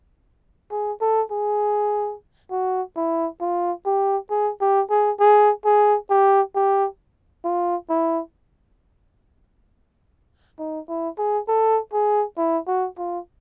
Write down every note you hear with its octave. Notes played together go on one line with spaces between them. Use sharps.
G#4
A4
G#4
F#4
E4
F4
G4
G#4
G4
G#4
G#4
G#4
G4
G4
F4
E4
D#4
E4
G#4
A4
G#4
E4
F#4
F4